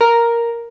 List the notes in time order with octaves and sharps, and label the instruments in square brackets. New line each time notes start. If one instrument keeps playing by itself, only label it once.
[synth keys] A#4